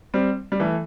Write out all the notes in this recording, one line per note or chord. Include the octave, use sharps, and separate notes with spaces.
G3 C4
G3
E3 A3